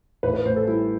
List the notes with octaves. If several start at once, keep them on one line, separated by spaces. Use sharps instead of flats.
A1 B4
B4
A2 C5
A4
G3 E4